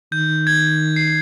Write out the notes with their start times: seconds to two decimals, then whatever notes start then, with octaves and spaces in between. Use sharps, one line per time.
0.12 D#3 G6
0.47 G#6
0.96 C7